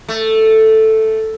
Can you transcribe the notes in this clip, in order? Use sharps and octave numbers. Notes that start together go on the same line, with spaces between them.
A3